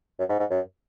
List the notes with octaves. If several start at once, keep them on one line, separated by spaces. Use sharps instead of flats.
F#2
G#2
G#2
F#2